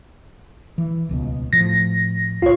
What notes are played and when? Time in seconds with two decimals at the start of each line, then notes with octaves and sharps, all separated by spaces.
0.78 E3
1.09 D#1 C#2 B2
1.53 A2 F3 A#6
2.42 C2 A2 F4 C#5